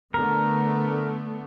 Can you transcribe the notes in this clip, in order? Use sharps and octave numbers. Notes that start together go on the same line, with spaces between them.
D3 A3 B3 A#4